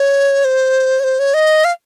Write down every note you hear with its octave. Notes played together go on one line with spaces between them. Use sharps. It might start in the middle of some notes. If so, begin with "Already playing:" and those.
Already playing: C#5
C5
C#5
C5
C#5
D#5
F5